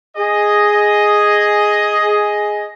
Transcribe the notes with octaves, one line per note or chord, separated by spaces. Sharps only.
G#4 D#5